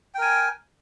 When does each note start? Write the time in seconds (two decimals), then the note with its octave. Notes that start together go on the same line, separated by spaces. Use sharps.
0.14 G5
0.18 A#4
0.22 G#5